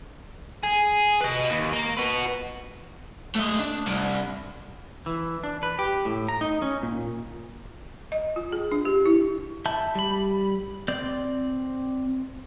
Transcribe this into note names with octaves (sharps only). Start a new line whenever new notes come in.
G#4
B4 D#5
D#2
A#3
F#4 B4
A3 D#5
D4
C2
E3
D4
B4
G4
A2
A#5
D#4
C#4
A#2
D#5
F4
G#4
D4
G4
E4
E5 A5 B5 G6
G3 B5
C4 D5 G6